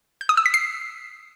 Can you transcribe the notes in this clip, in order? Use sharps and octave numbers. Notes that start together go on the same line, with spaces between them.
G6
D#6
E6
B6
C7